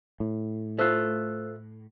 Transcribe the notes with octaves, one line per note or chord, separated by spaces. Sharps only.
A2
A3 F4 C5 E6 F#6